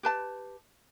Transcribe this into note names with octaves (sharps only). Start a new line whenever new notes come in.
G4 B4 A5